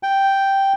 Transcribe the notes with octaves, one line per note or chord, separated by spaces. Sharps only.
G5